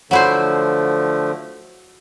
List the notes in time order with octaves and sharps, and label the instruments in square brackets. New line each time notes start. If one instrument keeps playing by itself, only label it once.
[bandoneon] D3 F3 A3 [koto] F#3 E4 C5